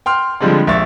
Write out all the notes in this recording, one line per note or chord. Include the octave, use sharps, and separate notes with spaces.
G5 C6 F6
D3 F3 G3 G#3 C4 D4
A#1 E5 C#6 A6